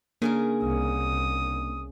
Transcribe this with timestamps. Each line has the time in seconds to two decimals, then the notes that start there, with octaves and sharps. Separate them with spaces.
0.22 C#3 A#3 D4 G#4 A#4
0.62 C2 D#6